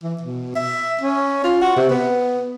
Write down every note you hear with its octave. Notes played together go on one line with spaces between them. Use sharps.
E3
B2
E5
C#4
F4
F#4
C3
B3